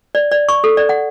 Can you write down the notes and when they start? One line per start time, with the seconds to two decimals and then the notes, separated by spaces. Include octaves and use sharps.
0.15 D5
0.31 D5
0.49 C#6
0.64 A4
0.77 D5
0.89 F#5